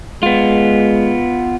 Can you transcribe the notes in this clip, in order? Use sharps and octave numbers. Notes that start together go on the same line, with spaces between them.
G#3 B3 F4